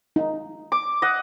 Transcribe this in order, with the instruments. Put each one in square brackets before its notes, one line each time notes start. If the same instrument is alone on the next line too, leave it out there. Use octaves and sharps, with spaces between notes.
[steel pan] D#4
[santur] D6
D#5 F#5